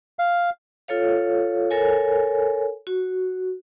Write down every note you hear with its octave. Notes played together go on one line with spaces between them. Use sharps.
F5
F4 A4 C#5 F5
A4 A#4 C#5 G#5
F#4